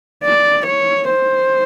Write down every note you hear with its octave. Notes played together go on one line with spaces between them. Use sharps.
D5
C#5
C5